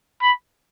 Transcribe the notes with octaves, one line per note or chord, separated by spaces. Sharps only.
B5